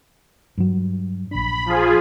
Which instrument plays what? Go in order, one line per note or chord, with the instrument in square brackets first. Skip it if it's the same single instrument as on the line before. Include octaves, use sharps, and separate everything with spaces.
[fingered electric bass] G2 F#3
[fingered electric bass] A#1 D4 [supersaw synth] B5
[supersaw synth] F3 F4 G#4